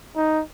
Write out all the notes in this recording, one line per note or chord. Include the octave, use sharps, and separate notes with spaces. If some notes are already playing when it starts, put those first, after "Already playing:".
D#4